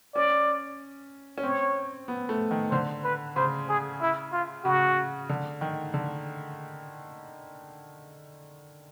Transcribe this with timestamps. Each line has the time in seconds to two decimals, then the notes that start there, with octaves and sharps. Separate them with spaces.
0.15 C#4 D5
1.38 C#4
1.43 C4 C#5
2.08 B3
2.29 A3
2.51 D#3
2.72 D3 C5
3.05 B4
3.36 C#3 C5
3.69 G#4
4.01 E4
4.32 F4
4.65 C#3 F#4
5.29 D3
5.61 D#3
5.94 D3